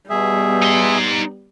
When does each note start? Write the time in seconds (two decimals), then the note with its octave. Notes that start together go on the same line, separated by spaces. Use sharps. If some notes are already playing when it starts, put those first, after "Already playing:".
0.10 B2 G3 B3 G#4 E5
0.62 D#4 C6